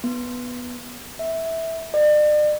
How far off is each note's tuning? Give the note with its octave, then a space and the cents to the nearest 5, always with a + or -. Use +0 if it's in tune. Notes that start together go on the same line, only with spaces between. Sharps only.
B3 -5
E5 -15
D5 +40